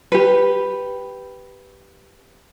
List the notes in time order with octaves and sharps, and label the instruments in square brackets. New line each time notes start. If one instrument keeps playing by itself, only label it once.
[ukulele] G4 B4